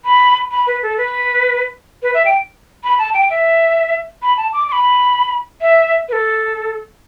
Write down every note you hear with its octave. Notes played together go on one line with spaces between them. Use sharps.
B5
B5
B4
A4
B4
B4
E5
G5
B5
A5
G5
E5
B5
A5
D6
D6
B5
E5
B4
A4